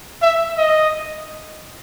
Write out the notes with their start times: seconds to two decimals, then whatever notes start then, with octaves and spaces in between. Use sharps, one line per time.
0.22 E5
0.58 D#5